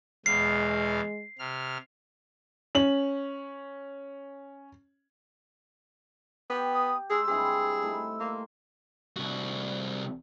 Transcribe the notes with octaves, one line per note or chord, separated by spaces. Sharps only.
E2 B2 G#3 F5 C7
C3 F6
C#4 F#7
B3 G4
D#6
G#3 D#4 G#4 E6
G2 C4 E4 G#4
A3 D#4 E4
A#3 C6
C2 F#4